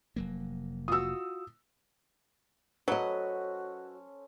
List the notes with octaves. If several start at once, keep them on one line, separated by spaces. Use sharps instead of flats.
F1 F#3 A#3
F4 F#4 D#6 E6
F#3 C#4 F#4 A4 B4 C5 D#5